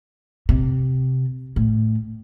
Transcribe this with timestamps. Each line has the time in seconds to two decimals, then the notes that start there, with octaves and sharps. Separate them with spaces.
0.49 C3
1.56 A2